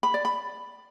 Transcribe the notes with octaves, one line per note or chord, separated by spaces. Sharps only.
B5
D5
B5